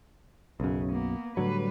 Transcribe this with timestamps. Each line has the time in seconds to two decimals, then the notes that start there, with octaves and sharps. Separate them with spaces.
0.60 B1 F#2 C#3
0.92 A#3 B3
1.37 A2 D3 F#3 G3 B4